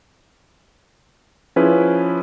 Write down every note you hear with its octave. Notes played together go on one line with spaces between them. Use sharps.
F3 C#4 E4 G#4 B4